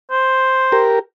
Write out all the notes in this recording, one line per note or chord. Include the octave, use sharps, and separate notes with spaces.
C5
G4 A#4